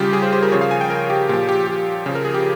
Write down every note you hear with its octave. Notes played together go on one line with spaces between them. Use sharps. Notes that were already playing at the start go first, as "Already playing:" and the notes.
Already playing: C#3 G3 F4 G4
G#4
C5
C5
A#4
C#3 F3 C#5
F5
G#5
G5
A#4
G4
A#2 F3 G4
G4
G4
C#3 F3
A#4
G#4
G4